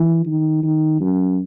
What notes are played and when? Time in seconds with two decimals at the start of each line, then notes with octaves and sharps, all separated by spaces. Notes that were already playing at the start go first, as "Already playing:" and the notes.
Already playing: E3
0.26 D#3
0.63 D#3
1.00 F#2